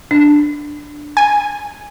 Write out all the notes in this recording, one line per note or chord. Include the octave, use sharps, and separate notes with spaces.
D4
G#5